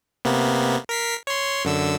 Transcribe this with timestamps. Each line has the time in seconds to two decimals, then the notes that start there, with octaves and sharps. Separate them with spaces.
0.25 C3 A#3 B3
0.89 A#4 B6 C7
1.27 C#5 C6
1.65 F#2 D3 E6